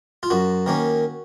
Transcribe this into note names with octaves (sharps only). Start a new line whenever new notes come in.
F4
F#2 F#4
D#3 A#3 C#4